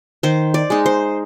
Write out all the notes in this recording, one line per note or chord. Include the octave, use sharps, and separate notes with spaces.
D#3 C5
D5
G#3 D#4
C5